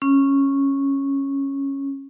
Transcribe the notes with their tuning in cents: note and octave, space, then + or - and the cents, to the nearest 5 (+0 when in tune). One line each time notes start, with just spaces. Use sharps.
C#4 -10